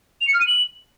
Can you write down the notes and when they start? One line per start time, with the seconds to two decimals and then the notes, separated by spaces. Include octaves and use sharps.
0.21 F7
0.27 C#7
0.34 F6
0.40 D#7
0.47 F#7